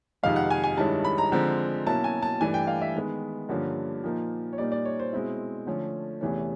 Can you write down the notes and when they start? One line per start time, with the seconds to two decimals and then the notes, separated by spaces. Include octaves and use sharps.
0.23 F2 C3 D#3 G#3 F5
0.36 F#5
0.51 G#5
0.64 G#5
0.77 G2 D#3 G#3 C#4 E4 A5
1.05 B5
1.18 A#5
1.32 D3 F3 G#3 C4
1.86 B2 F#3 A#3 C#4 E4 A5
2.04 G#5
2.23 A5
2.41 G2 E3 A3 D4 G#5
2.54 G5
2.67 F5
2.82 E5
2.96 D#3 G#3 B3
3.49 G2 D3 F3 A#3 C#4
4.04 A#2 F3 A#3 D#4
4.53 C#5
4.58 A#2 G3 A#3 D#4 D5
4.72 D5
4.85 C#5
5.00 C5
5.13 B2 G#3 C4 E4
5.67 D3 F3 A3 C#4
6.21 E2 C3 E3 A3 C#4